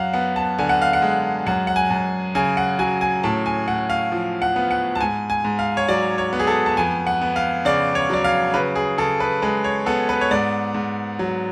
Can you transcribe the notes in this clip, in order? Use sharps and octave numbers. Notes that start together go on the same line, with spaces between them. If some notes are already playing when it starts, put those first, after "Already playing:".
Already playing: F#2 F5 F#5
B3 F#5
A5
D3 G#5
F#5
F5
F#5
G#3
F#2 F#5
F#5
G#5
F#2
C#3 G#5
F#5
F#3 G#5
G#5
A2 A5
G#5
A2 F#5
F5
F3
F#5
B3
F#5
A5
G#2 G#5
G#5
G#2
F5
C#5
F#3 D5
C#5
B3
G#4
A4
A5
F2 G#5
F#5
B3
F5
C#3 D5
C#5
F#3 D5
F5
C#3 B4
G#4
C#3 A4
B4
G#3 B4
C#5
B3 A4
B4
C#5
G#2 D5
G#2
F#3